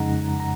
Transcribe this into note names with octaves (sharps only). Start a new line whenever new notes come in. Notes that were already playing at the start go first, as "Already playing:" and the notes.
Already playing: F2 C#3 G#3 D#4 F#5 A#5
A#5